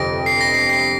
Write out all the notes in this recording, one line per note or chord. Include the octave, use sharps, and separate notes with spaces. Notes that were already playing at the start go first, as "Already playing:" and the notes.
Already playing: G1 F2 C3 A#6 D7
C7
A#6
C7
C7